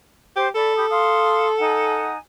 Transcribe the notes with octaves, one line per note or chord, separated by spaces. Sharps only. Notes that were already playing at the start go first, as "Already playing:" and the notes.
G4 C5
A4 D5 B5
G4 B5 D#6
F5 C6 D#6
D#4 F#5 G#5